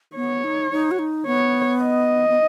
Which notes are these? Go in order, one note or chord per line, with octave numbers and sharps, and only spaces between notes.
B3 C#5
D#4
D#4
F#4
D#4
B3 C#5
D#5
B3